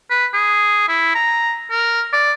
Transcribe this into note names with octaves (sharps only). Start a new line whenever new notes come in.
B4
G#4
E4
A#5
A#4
D5